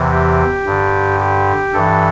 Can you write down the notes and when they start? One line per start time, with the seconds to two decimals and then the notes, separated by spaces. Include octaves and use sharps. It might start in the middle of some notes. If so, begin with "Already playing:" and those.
Already playing: E2 C3 E3
0.11 G4
0.66 G2 D3
1.20 G4
1.74 G2 E3 A4